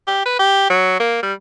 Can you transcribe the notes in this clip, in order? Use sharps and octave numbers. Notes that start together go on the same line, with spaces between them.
G4
B4
G4
F#3
A#3
G3